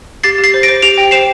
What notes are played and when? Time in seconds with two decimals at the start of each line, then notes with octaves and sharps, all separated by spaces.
0.23 G4 A6 C7
0.38 G4
0.44 A6 C7
0.54 C5
0.63 A#6 D7
0.68 C5
0.82 G4 D7 F7
0.98 G5
1.11 C5 C7 E7